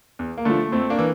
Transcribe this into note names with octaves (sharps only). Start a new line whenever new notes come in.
E2
A#3
D3 F3 A3
F2 A3 C4
A#3 D4
E3